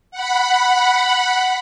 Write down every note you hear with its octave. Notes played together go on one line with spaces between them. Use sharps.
F#5 B5